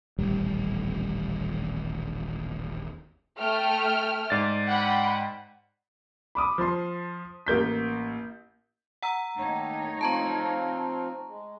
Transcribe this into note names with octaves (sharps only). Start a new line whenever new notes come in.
D#1 A1 G3
A3 G5 F6
G#2 D5 A6
F#5 G5 B5
B5 D6 D#6
F3 C6
A1 A#3 G6 B6
F#5 A#5 E6
D#3 A3 A#3 D#4 C#5 A5
F3 C4 F4 A5 A#5 C#6
G#3